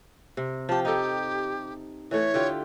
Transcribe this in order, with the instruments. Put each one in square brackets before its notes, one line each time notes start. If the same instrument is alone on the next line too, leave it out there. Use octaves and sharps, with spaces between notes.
[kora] C3
[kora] F3 G4 [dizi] A5
[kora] D#4 A4 [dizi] G4
[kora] E3 A3 [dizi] C#5
[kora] D3 F4 G4